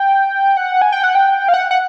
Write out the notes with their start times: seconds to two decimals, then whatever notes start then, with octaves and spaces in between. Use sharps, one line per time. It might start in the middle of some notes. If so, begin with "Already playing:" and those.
Already playing: G5
0.57 F#5
0.82 G#5
0.92 G5
1.04 F#5
1.15 G5
1.48 F5
1.54 F#5
1.71 F#5